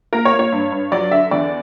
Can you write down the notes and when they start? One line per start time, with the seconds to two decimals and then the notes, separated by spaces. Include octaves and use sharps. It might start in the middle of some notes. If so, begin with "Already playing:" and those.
0.13 A#3 A#4
0.25 C#5
0.33 A#3
0.39 C#5
0.52 G2
0.72 G2
0.92 F#3 D5
1.11 D3 E5
1.31 E2 D5